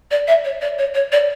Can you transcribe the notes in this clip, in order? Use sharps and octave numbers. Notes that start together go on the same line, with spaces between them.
D5
E5
C#5
D5
C#5
C#5
D5